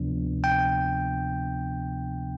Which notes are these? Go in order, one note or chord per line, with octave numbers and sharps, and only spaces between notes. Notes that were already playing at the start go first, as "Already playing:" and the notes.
Already playing: D2 C3 F3 B3 D4
G5